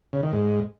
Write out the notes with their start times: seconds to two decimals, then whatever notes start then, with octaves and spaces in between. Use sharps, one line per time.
0.13 C#3
0.23 D#3
0.33 G#2